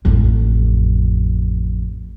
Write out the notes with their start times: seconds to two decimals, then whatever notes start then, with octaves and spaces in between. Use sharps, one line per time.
0.05 A1 F2